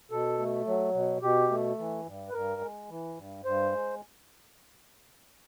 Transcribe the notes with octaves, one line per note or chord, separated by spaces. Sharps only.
B2 A4
A3
F#3
B2
B2 G4
A3
E3
G2
B4
G2 A#4
G#3
E3
G2
G2 C5
G#3